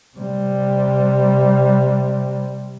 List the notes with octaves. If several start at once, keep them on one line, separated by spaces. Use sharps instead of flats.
C3 G3